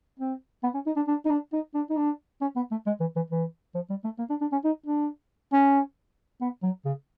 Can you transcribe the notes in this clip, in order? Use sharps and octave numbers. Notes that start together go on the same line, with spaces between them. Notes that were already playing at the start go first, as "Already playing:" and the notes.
C4
B3
C#4
D#4
D4
D4
D#4
D4
D#4
D4
D#4
D4
C#4
B3
A3
G#3
E3
E3
E3
F3
G3
A3
A#3
D4
D4
C#4
D#4
D4
C#4
B3
F#3
C#3